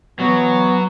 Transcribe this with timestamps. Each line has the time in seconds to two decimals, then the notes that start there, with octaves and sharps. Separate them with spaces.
0.20 E3 F#3 B3